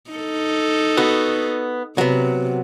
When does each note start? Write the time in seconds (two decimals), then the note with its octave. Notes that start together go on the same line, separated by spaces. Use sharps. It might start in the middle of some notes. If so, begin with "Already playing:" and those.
0.11 D#4 A4
0.97 B3 F#4
1.98 C3 F#3 B3